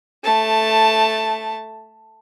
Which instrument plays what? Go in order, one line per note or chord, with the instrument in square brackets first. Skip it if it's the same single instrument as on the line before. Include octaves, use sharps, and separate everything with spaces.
[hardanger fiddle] A3 A5